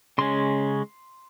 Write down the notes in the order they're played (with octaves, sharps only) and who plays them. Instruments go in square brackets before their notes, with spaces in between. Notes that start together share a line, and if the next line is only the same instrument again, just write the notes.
[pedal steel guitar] C#3 G#3 C#4 C6